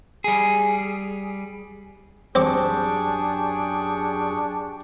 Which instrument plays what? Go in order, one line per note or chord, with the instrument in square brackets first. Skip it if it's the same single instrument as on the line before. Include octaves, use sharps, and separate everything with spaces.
[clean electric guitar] G3 G#4
[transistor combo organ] F#2 G4 [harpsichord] C4 D6 [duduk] D4 [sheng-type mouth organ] G#4 G5 C#6